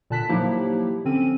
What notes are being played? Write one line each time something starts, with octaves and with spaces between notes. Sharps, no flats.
A#2 D3 A5 F#6 B6
F3 F#3 A#3 D#4 E4 G4
D3 C4 C#4 D#7